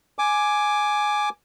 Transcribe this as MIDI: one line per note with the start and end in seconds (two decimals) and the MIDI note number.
0.19 1.29 80
0.19 1.29 86